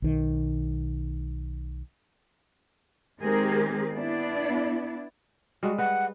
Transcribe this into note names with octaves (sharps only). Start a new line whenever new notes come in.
B1 D#3
D#3 G#3 C4 G4 G#4 A#4
B3 D4 E4 D5
G3 G#3 F#4
B4 F#5